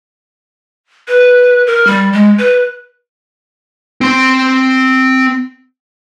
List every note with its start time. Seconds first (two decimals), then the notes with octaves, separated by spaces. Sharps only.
1.08 B4
1.67 A#4
1.87 G3
2.13 G#3
2.38 B4
4.01 C4 C6